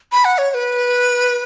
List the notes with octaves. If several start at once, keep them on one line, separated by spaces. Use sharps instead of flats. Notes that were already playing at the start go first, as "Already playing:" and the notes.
B5
F#5
C#5
C#5
B4